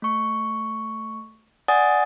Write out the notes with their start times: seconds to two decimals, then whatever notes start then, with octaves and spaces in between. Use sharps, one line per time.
0.02 A3 C#6
1.68 D5 F#5 G#5 D#6 A6